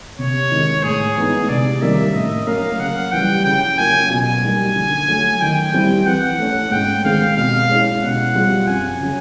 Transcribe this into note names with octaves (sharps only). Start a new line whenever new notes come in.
C3 C#5
D#3 G#3
A2 G#4
E3 G#3 B3 D#4
C3 D5
D#3 G3 A#3 C#4 E5
A2 D#5
F#3 A#3 C#4 F5
C#3 F#5
E3 G3 G5
C#3 G5
F#3 A#3 C#4 F4 G#5
B2 G#5
G3 A#3 D#4 G4
D3
F#3 A3
D#3 G5
G3 C4 E4 G4
E3 F#5
A3 C#4
G#2 G5
D#3 G#3 C4 F5
B2 F5
G#3 C#4 E4
B2 F#5
G3 C4 F4 G#4
F#2 G#5
C#3 F#3